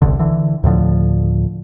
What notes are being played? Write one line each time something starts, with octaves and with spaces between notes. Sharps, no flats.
D1 G1 C2 D3
D3 E3
D2 A2 D3 F3